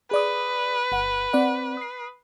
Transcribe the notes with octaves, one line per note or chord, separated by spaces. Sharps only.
G#4 B4 D5 D#6
G1 F#5
C4 D5 F#5
D#6 C7